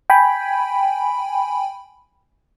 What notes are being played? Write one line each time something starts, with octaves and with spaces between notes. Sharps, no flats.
G5 G#5 B5